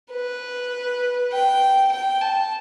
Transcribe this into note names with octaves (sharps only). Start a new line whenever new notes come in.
B4
G5
G5
A5